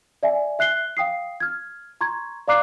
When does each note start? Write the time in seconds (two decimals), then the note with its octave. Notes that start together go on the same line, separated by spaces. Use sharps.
0.23 D5 E5 G#5
0.59 E5 F#6 C7 G7
0.97 F5 G5 D#6 C7
1.40 F6 G#6
2.01 A#5 C6 C#6 G#6
2.48 D5 F5 A#5 D6 F#6 C7